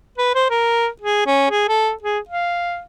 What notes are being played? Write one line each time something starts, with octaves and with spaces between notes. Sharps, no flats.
B4
C5
A#4
G#4
C#4
G#4
A4
G#4
F5